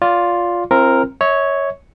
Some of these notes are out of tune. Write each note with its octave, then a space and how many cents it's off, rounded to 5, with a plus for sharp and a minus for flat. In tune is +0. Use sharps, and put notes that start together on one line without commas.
F4 +10 D5 -25
C4 +25 F4 -35 A#4 +0
C#5 +0 E5 -40